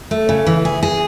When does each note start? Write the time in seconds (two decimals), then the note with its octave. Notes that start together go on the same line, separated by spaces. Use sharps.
0.11 A3
0.29 C#3
0.47 E3
0.65 G#4
0.83 G#4